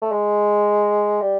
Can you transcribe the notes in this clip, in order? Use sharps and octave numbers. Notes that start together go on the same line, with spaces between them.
A3
G#3
G3